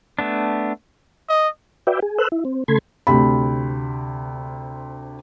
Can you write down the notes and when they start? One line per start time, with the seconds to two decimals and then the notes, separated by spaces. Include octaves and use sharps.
0.19 A3 B3 D4
1.29 D#5
1.87 F#4 B4 D5 E5 G5
2.02 G#4
2.18 A4 B4 C5 E6 F#6
2.32 E4
2.45 C4
2.68 C#3 A3 A4 B5 C6 G#6
3.07 D2 C3 B5